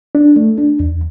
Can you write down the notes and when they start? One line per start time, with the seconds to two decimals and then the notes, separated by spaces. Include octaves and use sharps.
0.15 D4
0.36 A3
0.58 D4
0.80 E2